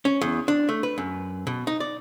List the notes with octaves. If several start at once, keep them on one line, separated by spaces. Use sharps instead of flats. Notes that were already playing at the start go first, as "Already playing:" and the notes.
C#4
E2
D4
A3
B4
F#2
B2
D#4
D5